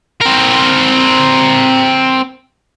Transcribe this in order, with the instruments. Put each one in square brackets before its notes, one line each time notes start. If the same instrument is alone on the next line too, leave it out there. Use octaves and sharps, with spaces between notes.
[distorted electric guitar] C4 A#4